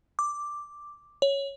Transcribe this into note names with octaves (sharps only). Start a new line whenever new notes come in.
D6
C#5